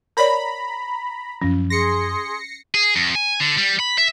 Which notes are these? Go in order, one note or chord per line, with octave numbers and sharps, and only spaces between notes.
A#4 C#5 D5 A#5 B5
F#2 F3 C#4
G#4 C6 A#6 C7 C#7
G#4
F2
G#5
D3
G3
B5
E5